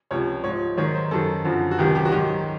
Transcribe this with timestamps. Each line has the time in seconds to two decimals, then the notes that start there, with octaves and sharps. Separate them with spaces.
0.11 C#2 C3 F3 C#5
0.44 G#2 F3 C#5
0.77 G#2 D#3 F#3 C#5
0.94 C5
1.11 F#2 D#3 F#3 A4
1.45 F#2 D3 F3
1.71 F#4
1.78 C#2 C3 D#3 F#3 G4
1.95 G4
2.05 F#4
2.12 G#2 D#3 F#3 G4